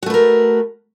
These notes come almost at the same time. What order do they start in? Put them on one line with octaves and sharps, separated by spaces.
F#4 A3 B4 A#4